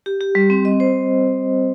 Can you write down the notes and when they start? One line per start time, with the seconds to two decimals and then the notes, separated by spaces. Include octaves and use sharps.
0.06 G4
0.21 G4
0.35 G3
0.50 C4
0.65 D#5
0.80 C5